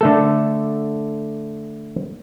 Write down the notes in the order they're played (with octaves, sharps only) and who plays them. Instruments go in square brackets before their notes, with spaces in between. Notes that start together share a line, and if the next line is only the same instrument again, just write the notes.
[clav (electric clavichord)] D3 A3 A4